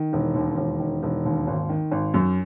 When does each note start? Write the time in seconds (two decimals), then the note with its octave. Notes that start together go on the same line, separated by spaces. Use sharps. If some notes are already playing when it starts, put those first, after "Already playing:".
Already playing: D#3
0.13 E1
0.35 D#2
0.57 E1
0.80 D#3
1.03 E1
1.25 D#2
1.47 G#1
1.69 D#3
1.91 G#1
2.14 F#2